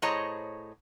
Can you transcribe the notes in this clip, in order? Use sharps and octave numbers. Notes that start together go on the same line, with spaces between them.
A2 G#4 C5 C#5 D#5 A#5